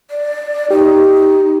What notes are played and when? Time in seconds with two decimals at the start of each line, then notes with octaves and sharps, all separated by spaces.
0.10 D5
0.71 D#4 G4